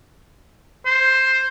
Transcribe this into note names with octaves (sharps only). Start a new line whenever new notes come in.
C5